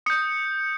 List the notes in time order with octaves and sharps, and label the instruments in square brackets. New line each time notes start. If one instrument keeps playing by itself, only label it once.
[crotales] D#6 G6 C#7